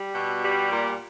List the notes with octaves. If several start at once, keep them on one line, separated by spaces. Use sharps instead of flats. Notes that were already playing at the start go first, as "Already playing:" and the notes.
Already playing: G3
B2
G3
A#2